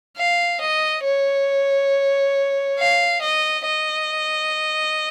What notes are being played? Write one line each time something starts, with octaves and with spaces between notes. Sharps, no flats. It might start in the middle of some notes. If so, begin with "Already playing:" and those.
F5
D#5
C#5
F5
D#5
D#5